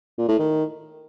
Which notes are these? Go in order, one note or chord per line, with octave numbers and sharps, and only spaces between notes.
A#2
A2
D#3